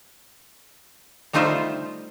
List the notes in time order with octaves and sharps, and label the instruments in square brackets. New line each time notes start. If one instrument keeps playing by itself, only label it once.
[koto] G3 A3 D#4 F4 C5 E5